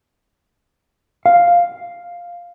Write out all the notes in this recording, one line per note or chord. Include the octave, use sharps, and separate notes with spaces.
F5